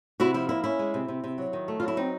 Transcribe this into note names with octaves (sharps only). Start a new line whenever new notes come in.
C3 E4 F#4
F3 E4
A#3 E4
C#4 E4
G#3
C3
C3
C3
F#3
D#3
A3
F4
F#3 E4
C4 D#4